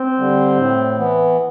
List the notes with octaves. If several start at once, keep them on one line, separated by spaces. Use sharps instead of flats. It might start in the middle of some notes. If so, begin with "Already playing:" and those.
Already playing: C4
D3 G3
A2
E3 B3